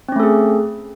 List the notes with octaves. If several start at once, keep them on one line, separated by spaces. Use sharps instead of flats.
A3 C4 C#4 G#4 A4